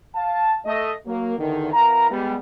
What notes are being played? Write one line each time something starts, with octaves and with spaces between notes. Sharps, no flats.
F5 A5
A3 D#5
F#3 A#3
E2 D3 D#3
B3 E4 A#4 F5 A#5
G3 G#3 B3